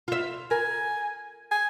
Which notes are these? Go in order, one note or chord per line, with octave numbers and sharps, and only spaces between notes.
F4 E5
A#4 G#5
G#5